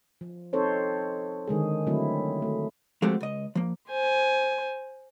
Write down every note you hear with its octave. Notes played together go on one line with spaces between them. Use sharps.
F3
C4 D#4 A4 C5 C#5
D3 D#3 G#3 G#4
D3 F#3 A3 C4 E4
A3
F3 G#3 A3 C4 F#4 G4
C#2 D#5
F3 A#3
C5 G#5